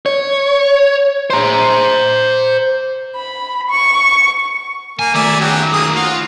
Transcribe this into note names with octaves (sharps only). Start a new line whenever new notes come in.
C#5
C5 A#5
B5
C#6
A#3 G#5
D#3 A3 D5 E5 G#5
F#3 G4 G#4
A#3 G#4 D#6
F4 F#4